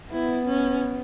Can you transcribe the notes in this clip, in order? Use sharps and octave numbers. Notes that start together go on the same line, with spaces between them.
B3 E4
C#4